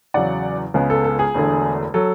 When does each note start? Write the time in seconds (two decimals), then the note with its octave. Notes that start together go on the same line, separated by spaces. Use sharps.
0.14 E2 C#3 F#3 D5 F#5
0.74 C#2 C#3 G#3 B3
0.90 A4
1.04 A4
1.19 G#4
1.34 E1 E2 D3 A3
1.94 F#3 A4